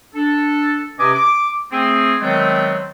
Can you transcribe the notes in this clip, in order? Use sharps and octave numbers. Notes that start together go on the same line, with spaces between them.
D4 A4
C3 C#4 B4 D#5 G#5 D6
D6
A3 C4 G#4
D#3 F#3 G#3 A3 B3 C4